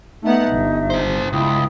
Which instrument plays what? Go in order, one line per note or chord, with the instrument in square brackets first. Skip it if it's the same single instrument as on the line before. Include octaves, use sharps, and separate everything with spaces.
[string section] A3 B3 F#5 [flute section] D#4 E5
[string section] G1
[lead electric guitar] E4 C5
[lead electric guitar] C#2 [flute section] E4 G5 D#6